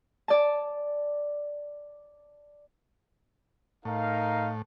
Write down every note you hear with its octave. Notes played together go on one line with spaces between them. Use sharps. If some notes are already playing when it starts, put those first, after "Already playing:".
D5 A5
A2 D#4 A#4 F5